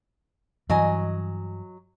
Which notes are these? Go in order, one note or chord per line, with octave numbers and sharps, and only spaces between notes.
G2 E3 F#3 D#5 G#5